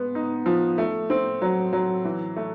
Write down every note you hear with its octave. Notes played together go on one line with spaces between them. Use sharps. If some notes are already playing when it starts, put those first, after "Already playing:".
Already playing: G#3 B3
D#4
F3
A3
C4
F#3
F#3
E3
A3